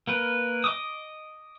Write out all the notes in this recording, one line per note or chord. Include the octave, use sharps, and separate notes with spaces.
A#3 A#4 B4
D#5 D6 D#6